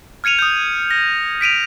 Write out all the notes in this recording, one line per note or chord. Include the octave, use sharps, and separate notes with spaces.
F6 G#6 C#7 D#7 F7
D#6 G6
A#6
B6 D7 D#7 F7